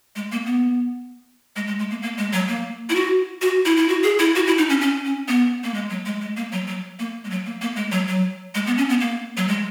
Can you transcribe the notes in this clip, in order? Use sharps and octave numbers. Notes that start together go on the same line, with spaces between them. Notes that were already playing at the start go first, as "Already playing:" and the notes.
G#3
A#3
B3
G#3
G#3
G#3
A#3
A#3
G#3
F#3
A#3
E4
F#4
F#4
E4
E4
F#4
G#4
E4
F#4
E4
D#4
C#4
C#4
C#4
B3
A#3
G#3
F#3
G#3
G#3
A#3
F#3
F#3
A#3
G#3
F#3
A#3
A#3
G#3
F#3
F#3
G#3
B3
C#4
B3
A#3
F#3
G#3